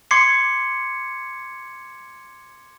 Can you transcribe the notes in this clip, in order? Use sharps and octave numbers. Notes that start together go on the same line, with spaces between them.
C6 D6 G#6 C7 C#7